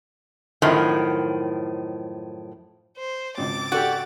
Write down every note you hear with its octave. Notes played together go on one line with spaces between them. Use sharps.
F#2 A2 D#3 F3
C5
G#1 C#2 D6 A6
F#4 G4 A4 D5